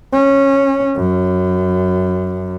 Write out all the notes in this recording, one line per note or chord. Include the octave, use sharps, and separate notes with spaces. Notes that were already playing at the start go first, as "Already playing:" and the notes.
C#4
F#2